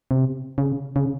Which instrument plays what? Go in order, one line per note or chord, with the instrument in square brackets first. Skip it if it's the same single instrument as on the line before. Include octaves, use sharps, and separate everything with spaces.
[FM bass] C3
C#3
C#3